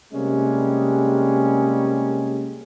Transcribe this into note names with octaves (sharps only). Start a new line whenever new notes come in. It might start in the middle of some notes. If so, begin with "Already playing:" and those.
C3 G3 G#3 A#3 C#4